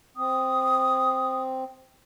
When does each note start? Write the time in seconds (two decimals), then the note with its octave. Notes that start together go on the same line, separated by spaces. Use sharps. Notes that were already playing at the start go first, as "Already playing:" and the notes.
0.17 C4 D#6